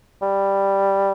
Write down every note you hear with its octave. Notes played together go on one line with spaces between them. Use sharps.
G3